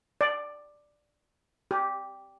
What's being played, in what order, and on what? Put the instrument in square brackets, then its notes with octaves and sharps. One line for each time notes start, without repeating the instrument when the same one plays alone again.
[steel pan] D5
G4